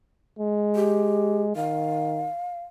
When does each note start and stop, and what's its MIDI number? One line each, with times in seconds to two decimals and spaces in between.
0.39 1.53 56
0.76 1.43 67
1.56 2.29 51
1.56 2.63 77